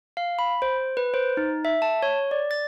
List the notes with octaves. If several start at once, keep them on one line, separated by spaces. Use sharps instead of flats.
F5
B5
C5
B4
C5
D#4
E5
A5
C#5
D5
A6